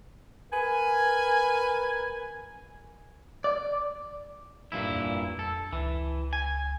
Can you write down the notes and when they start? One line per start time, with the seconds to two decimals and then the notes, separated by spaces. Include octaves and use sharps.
0.52 A#4 B4 G#5
3.44 D5
4.72 G2 A#2 E4
4.91 F2
5.39 A4
5.73 C#2 E3
6.33 G#5